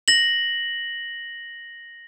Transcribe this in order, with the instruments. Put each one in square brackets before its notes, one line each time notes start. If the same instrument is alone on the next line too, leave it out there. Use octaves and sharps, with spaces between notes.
[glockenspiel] A#6 F#7